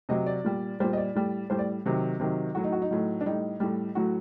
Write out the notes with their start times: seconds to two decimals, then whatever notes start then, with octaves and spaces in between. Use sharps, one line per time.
0.09 C3 F#3 D#5
0.26 D5
0.44 A#2 G3
0.80 A#2 G3 C5
0.93 D#5
0.97 D5
1.15 A2 G3
1.50 A2 G3 C5
1.59 D5
1.86 C3 D#3 F#3
2.20 C3 D#3 F#3
2.55 A2 F#3 F#4
2.64 D#4
2.72 F#4
2.82 D#4
2.91 A2 F#3
3.21 D4
3.26 A2 G3 D#4
3.60 A2 G3
3.95 A2 F#3 F#4